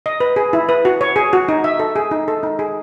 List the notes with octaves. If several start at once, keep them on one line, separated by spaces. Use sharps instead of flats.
D#5
B4
G#4
E4
B4
F#4
C#5
G#4
F#4
D#4
E5
A4
G#4
D#4
A4
D#4
G#4